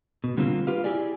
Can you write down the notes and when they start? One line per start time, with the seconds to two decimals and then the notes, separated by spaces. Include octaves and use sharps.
0.24 B2
0.37 D3 G3 A#3 C4 D#4 F4
0.67 F4 G4 B4 F5
0.84 E4 G4 G#4 D5